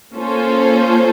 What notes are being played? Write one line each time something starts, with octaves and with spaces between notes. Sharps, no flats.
A#3 C#4 F4 A4 C5